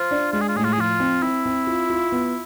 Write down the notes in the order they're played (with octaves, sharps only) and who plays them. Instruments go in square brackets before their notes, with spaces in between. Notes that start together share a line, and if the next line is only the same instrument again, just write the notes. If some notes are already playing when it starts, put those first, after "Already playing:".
Already playing: [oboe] F4 [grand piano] C5
[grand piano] D4
[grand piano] G#3 [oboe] F4
[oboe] G#4
F4
[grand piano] A2 [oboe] G#4
[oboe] F4
G#4
[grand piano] F3 [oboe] F4
[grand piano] C4
[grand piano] C4 [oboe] E4
[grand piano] C4
F4
F4
B3